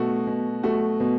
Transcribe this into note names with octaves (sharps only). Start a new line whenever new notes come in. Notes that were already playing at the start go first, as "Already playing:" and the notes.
Already playing: B2 A3 F#4
B2
A3 F#4
B2